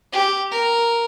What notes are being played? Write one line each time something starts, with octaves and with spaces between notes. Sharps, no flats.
G4
A#4